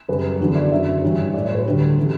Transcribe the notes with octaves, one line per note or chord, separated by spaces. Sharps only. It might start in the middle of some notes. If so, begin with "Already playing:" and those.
F#2 C#3 G3 B4
E2 D3 F#3
D5
F#2 D3 F#3 E5
G2 E3 G3 C#5
A2 F#3 D5
C#5
B4
D2 D3 G3 A4
C#3 E3 G3 G4